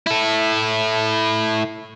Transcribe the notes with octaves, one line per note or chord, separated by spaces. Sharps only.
E4 A4